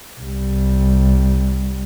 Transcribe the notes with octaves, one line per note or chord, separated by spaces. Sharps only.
C2 G3